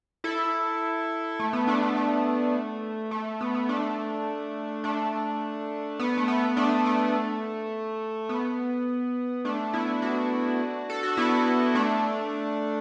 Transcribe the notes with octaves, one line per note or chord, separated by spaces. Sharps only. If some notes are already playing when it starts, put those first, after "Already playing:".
E4 A4
A3
B3
A3 D4
A3
A3
A3
B3
B3
A3 D4
A3 D4
B3
A3
B3
A3 D4
A3
B3
A3 D4
B3 E4
D4 F#4
A4
F#4
B3 E4
A3 D4